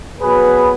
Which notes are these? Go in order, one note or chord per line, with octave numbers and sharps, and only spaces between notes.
B2 F#3 B3 G#4 B4